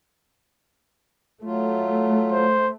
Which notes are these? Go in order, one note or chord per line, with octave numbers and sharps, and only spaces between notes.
F#3 A3 F4
C5